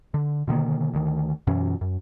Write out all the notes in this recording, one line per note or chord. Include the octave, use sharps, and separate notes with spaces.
D3
B2 D3 D#3 A#3
D2 D#3
F#2 B2 E3 C#4
F#2